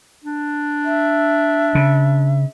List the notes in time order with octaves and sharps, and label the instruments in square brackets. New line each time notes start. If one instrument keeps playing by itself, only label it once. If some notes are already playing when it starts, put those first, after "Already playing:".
[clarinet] D4
[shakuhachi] E5
[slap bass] C#3